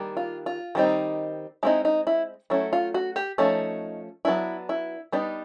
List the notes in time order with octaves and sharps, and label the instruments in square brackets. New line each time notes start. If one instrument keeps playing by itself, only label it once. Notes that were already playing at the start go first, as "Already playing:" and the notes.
Already playing: [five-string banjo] D#3 G3 A#3 D4
F4
F4
D#3 G3 C4 D#4
G#3 C4 D#4 E4
D#4
E4
F#3 A3 C#4 E4
F4
F#4
G4
F3 A3 C#4 D#4
F#3 B3 D4 E4
E4
G3 B3 D4 D#4